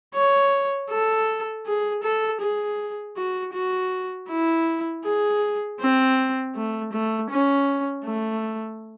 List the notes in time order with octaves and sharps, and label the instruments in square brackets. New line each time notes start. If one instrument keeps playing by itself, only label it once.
[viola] C#5
A4
G#4
A4
G#4
F#4
F#4
E4
G#4
C4
A3
A3
C#4
A3